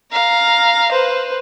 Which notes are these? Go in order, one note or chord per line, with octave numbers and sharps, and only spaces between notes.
F5 A#5
B4 C5